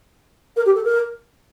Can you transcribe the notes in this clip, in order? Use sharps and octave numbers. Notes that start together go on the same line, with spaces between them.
A#4
G4
A4
A#4